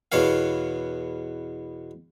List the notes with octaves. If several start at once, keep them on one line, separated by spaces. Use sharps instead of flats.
E2 B2 B3 C#5 F5